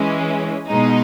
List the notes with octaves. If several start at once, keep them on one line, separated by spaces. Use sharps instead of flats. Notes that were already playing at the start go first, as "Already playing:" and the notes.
Already playing: E3 G#3 C#4
B2 G#3 D#4